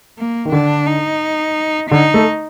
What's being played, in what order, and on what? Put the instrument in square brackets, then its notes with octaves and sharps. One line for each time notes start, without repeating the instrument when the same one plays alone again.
[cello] A#3
[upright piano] D#3
[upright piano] D3 [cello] D4
[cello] D#4
[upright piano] D3 [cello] D#4
[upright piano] A3